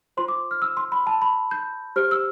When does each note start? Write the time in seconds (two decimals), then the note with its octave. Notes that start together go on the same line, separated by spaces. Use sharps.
0.17 F4 C5 C6
0.28 D6
0.51 F6
0.62 E6
0.77 C6
0.92 B5
1.07 A5
1.22 B5
1.51 G6
1.96 G4 C5 F6
2.11 E6